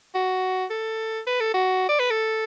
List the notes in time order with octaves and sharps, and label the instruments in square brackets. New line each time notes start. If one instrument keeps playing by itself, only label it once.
[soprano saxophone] F#4
A4
B4
A4
F#4
D5
B4
A4